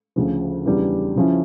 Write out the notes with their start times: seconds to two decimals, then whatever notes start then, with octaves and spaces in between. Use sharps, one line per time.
0.16 D2 C#3 F3
0.65 E2 C#3 G3 D4
1.16 C#3 F3 C#4 E4